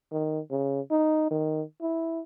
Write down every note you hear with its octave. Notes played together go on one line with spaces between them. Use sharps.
D#3
C#3
D#4
D#3
E4